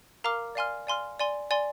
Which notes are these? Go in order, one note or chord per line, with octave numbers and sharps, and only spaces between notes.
A#4 F5 A#5 D6 F6
D5 F5 G#5 C6 F6
D5 F5 G#5 C6 F6
D5 G#5 C6
D5 G#5 C6